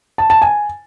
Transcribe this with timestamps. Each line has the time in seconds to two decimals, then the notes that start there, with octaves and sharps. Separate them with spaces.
0.18 A5
0.30 A5
0.42 G#5